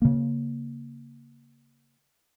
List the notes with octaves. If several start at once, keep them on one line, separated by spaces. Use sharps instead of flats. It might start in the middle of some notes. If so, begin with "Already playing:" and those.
C#3 A#3